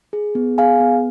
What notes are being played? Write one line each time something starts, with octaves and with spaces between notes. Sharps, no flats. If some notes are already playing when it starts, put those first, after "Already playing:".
G#4
B3
G#4 F5 G#5
B3